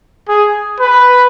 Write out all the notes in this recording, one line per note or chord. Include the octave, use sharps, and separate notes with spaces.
G#4
B4